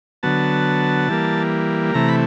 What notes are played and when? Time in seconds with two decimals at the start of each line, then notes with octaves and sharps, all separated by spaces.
0.23 D3 F#3 B3 A5
1.08 E3 G3 A#3
1.94 C3 E3 A3 A#5
2.08 B5